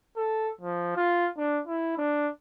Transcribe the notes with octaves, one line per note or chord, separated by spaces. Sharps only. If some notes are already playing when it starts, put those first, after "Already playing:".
A4
F3
F4
D4
E4
D4